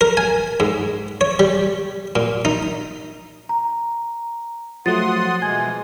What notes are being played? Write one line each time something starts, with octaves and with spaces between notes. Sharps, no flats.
A#4
G#5
G#2
C#5
G3
A#2
D#4
A#5
F3 F#3 A3 F#5 C6 D#6 A6
B2 E3 G#3 G#5 G#6